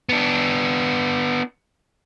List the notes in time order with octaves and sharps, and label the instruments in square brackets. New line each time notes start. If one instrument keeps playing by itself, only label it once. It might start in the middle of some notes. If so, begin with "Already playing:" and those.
[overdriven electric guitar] B3 D4